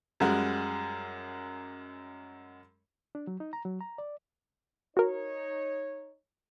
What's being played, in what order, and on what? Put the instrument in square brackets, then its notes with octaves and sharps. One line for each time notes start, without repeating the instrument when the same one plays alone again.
[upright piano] F#2 G3 G#3 F#4
[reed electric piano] D4
F#3
D#4
A#5
F#3
A#5
D5
[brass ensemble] D#4 C#5 [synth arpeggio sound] F#4 A#4